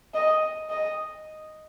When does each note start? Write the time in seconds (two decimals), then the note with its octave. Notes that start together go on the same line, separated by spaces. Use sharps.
0.14 D#5
0.70 D#5